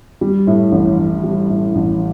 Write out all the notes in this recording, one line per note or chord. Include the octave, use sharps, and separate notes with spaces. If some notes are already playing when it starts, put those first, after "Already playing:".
G3
A2
A1
A1
G3
A2
A1